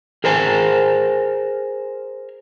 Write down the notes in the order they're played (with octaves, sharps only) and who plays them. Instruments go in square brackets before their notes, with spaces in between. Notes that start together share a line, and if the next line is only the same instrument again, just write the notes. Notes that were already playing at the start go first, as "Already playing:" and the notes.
[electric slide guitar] G#4 A#4 C5 G#5